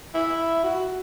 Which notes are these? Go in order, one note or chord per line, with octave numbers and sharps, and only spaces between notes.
E4
F#4
F#4